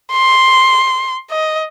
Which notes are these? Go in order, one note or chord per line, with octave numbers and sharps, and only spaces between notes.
C6
D#5